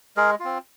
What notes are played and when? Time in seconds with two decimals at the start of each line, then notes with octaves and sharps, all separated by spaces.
0.17 G#3 G#4 A#4
0.40 C4 F4